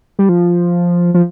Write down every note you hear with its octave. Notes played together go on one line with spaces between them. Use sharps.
G3
F3
F3